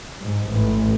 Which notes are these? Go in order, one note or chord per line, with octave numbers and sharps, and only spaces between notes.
G#2
A1